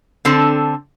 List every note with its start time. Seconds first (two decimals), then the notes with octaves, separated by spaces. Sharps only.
0.25 D3 C4 A4